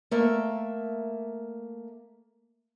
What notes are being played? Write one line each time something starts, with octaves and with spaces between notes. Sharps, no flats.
A3 A#3 E5